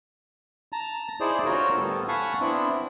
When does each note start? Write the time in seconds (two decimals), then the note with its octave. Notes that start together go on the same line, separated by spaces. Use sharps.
0.72 A5 A#5
1.20 D#4 E4 G#4 C5 D5
1.45 D3 F4 F#4 A#4 C5 C#5
1.76 A2 G3 B3 A4
2.08 F5 F#5 G#5 A5 B5 C#6
2.41 B3 C4 D4 E4